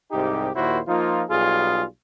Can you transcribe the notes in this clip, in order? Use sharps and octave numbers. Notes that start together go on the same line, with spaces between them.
C2 G#2 D#4 G4
D#2 A#2 E4 F#4 C5
F3 A#3 D#4 F4
B1 G3 F4 G#4